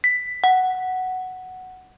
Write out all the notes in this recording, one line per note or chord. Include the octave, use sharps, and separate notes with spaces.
B6
F#5